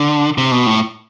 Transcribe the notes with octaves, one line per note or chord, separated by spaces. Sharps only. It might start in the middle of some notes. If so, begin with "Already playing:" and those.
Already playing: D3
C3
B2
A2